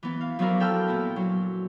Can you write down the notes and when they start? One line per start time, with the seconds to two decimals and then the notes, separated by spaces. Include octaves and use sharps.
0.03 E3 B3
0.21 F5
0.39 F3 F#3 B3 D4 E4 A#4
0.60 A4 A#4 G5 B5 E6 F6
0.87 A#2 B3 E4
1.16 F#3